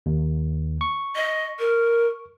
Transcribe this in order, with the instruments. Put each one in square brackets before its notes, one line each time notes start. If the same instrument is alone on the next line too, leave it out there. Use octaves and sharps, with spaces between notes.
[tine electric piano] D#2
C#6
[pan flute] D#5
A#4